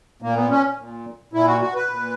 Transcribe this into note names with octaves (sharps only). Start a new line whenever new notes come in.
A#2 A#3
B3
C#4
A#2
A#2 E4
F#4
F#4
B4
A#2